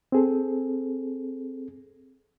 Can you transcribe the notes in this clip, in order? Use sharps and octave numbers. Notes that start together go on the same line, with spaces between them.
C4 G#4 A4